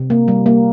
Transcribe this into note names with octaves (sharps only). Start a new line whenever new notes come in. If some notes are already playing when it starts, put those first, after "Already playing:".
Already playing: C3
A#3
G3
A#3